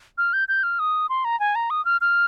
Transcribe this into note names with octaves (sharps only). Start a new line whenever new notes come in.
F6
G6
G6
F6
D#6
C6
A#5
G#5
A#5
D#6
F6
F6